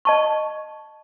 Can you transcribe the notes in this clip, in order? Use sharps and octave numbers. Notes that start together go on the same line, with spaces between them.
D#5 A5 C#6